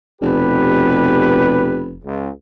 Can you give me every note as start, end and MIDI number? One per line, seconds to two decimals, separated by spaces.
0.22 2.03 29
0.22 1.90 47
0.22 1.90 67
0.22 1.90 71
2.04 2.30 37